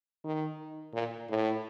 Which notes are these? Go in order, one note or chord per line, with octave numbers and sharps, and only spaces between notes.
D#3
A#2
A2